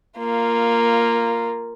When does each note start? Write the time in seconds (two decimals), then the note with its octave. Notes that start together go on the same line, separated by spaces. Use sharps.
0.18 A#3 F4